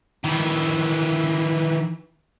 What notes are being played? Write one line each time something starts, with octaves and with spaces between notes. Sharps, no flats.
D#3 E3